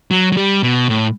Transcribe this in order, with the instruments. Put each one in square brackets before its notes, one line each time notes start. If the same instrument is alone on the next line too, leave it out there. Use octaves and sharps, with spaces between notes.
[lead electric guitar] F#3
F#3
G3
B2
A2